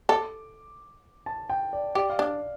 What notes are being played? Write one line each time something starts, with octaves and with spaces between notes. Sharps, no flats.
A4 D6
A5
G5
D5
G4 D5
F5
D4 D5